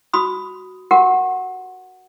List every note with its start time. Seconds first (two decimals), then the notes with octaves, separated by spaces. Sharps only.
0.13 F#4 B5 D#6
0.91 F#4 G4 A#4 F#5